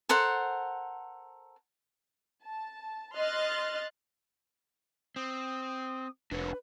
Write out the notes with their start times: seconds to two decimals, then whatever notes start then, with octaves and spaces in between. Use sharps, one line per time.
0.09 A4 A#4 C5 F#5
2.43 A5
3.16 D#5 C6 F6 F#6 A6
5.16 C4 D#6
6.31 F1 D4 A#4 B4 C#5